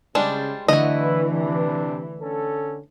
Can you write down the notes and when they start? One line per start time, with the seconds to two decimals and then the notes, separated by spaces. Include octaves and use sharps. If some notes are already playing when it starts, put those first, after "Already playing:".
0.15 C#3 G3 G#3 D4 C5
0.68 D3 E3 A3 E4 F#4 B4 D#5
1.32 C3 D4
2.21 D3 C#4 A4